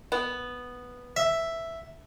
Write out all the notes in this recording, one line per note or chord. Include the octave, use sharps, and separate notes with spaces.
B3
E5